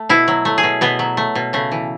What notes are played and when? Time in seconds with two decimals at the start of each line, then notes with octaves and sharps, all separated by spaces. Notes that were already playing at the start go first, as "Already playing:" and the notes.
Already playing: A3
0.09 B2 E4
0.28 F#3
0.45 A3
0.58 G#4
0.63 B2
0.81 B2 B3
0.99 F#3
1.17 A3
1.35 B2
1.53 C#3 A3
1.72 E3